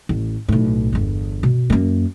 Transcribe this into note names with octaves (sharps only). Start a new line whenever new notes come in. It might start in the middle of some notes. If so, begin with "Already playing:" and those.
A1
B1 A2
G1 E2
B2
F#2 A#3